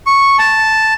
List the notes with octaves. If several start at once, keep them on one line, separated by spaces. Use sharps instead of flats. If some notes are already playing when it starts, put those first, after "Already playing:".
C#6
A5